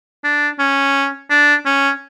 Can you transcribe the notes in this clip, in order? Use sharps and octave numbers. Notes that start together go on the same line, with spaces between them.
D4
C#4
D4
C#4